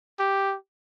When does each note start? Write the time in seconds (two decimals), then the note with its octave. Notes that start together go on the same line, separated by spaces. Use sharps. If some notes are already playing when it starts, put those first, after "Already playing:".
0.19 G4